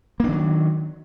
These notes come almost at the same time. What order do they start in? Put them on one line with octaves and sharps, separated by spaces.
A#3 D4 D#3 F#3